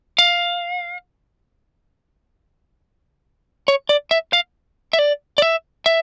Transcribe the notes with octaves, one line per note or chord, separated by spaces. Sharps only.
F5
C#5
D5
E5
F5
E5
D5
D5
E5
E5